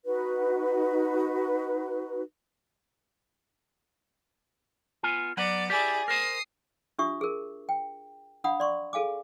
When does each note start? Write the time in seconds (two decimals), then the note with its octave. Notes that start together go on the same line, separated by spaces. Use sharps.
0.05 D#4 F#4 B4
5.03 B3 F4 G#5
5.37 F#3 B3 D5 F#5
5.70 E4 G4 G#4 D5
6.08 A#4 C5 D#6 C7
6.99 D4 F4 G4 E5 C#6 D#6
7.21 G#4 A#4
7.69 G5
8.44 D4 F5 F#5 B5 D#6
8.60 D5 C6 C#6
8.93 G#4 A4 F5 G#5 D6